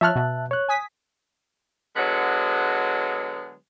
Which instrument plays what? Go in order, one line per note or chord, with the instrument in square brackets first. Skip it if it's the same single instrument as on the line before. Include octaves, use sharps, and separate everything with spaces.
[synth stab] F3 C#5 F6 [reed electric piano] E5 A5 F#6
[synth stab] B2
[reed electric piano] C#5 F#6
[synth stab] G#5 D#6 B6
[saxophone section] D3 F#3 G#3 B3